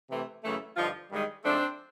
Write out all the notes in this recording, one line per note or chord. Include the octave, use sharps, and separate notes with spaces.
C3 E3 A3
F#2 C#3 E3 A3
G2 D3 F3 D#4 F4
G2 D#3 G#3
G#2 F3 A3 C4 D4